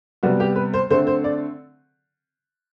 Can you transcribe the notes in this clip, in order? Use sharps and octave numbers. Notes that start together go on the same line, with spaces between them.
C3 G3 B3 F#4
G4
B4
C5
D3 A3 C4 C5
C5
D5